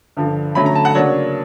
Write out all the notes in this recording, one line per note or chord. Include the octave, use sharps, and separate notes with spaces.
G2 D3 F3
D3 F#3 A3 C#4 B5
A#5
A5
F#5
C#3 F#3 A#3 D4 C#5